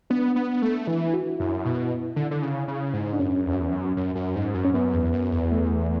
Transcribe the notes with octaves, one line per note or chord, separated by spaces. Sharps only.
B3 D4
B3
A3
E3 E4
F#4
F#2 E4
B2
D3
D3
C#3
C#3
G#2
D4
F#2 C#4
E2
F#2
E2
F#2
F#2
F#2
G#2
F#2
C#4
F#2 B3
E2
F#2
E2
A3